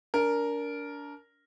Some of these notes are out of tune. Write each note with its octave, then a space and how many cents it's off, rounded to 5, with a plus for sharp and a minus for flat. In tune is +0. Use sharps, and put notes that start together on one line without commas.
D4 -30 A#4 +0